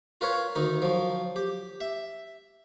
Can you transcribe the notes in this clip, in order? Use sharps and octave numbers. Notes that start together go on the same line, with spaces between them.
F4 A#4 B4 C#5
D2 D#3 D#4
F3 F#3
G4
E5